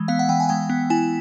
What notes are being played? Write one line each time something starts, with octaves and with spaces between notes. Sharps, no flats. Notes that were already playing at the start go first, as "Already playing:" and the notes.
Already playing: E3 G#3
B3 F5
F#5
E3 G5
G#5
G#3 G5
B3
E4 G#5